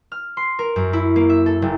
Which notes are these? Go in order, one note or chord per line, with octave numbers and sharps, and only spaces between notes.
F6
C6
A#4
F#2
E4
A#3
E5
A4
F#1